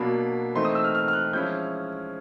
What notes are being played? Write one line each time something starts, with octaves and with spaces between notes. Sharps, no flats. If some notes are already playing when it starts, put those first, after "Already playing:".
Already playing: B2 F#3 A#3 D4 B5
E3 A3 C4 D#4 C6
D#6
E6
F6
F6
F6
F#6
F3 G#3 C#4 E4 G6